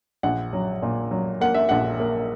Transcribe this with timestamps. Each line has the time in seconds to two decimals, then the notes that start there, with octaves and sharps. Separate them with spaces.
0.23 A#1 F#5
0.53 F#3
0.82 A#2
1.11 F#3
1.41 A#3 F#5
1.54 E5
1.69 A#1 F#5
2.00 A#3